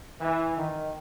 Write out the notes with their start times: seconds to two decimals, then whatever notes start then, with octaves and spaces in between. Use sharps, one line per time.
0.20 E3
0.56 D#3